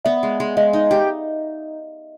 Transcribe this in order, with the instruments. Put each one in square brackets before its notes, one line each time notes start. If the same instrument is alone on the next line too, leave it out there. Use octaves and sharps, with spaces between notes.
[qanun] B3 [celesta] D5 E5
[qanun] G#3
G#3
[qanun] G#3 [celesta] D#5 F5
[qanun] D#4
G4